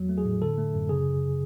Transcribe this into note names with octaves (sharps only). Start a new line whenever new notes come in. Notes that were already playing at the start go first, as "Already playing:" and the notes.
Already playing: E2 F#3
A3
G#4
A2
D3 A4
A3
F#2
C#3 G#4